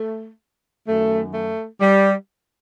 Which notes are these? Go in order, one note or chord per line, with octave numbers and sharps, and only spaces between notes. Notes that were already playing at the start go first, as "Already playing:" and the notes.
Already playing: A3
F#2 D#3 F#3 A3
A3
G3